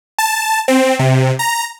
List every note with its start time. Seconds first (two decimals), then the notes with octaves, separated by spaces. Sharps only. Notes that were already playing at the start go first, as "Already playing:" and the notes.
0.18 A5
0.68 C4
0.99 C3
1.39 A#5